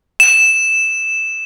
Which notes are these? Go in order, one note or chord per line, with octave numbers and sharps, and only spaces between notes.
E7